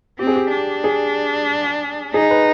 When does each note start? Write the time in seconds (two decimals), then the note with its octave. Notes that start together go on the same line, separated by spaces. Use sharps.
0.19 C4 G4
0.27 G#4
0.36 G4
0.51 D4
0.84 G#4
2.14 D#4 G#4
2.31 B4